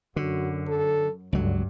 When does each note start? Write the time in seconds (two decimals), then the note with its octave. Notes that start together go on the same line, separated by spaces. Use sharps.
0.16 F#2 D3 F#4
0.67 A4
1.33 C#2 G2 D3 F#3